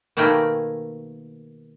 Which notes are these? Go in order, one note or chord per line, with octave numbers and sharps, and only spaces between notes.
B2 D#3 A3 A#3 G#4 G5